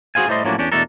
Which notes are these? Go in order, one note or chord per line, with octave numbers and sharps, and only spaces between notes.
F#4 G#4 C5 F5 G#5
A2 G3 A3 C5 D#5 C6
A2 F3 F#3 A#3 C#4 D4
E2 C#4 D4 G4
E2 B2 A3 D4 A4 A#4